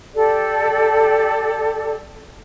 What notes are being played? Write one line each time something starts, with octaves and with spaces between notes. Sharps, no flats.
G4 A4 D5